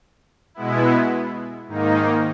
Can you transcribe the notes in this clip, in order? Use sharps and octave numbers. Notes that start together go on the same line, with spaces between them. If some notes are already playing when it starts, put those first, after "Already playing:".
B2 G#3 B3 E4
G#2 D#3 A#3 D#4